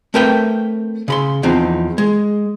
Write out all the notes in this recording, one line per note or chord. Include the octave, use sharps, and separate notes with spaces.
A3 C4 A#4 B4 E5 G5
C#3 B5 C6
E2 F3 C4 D#4
G#3